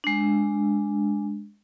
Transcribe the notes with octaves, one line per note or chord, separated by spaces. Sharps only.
G#3 D4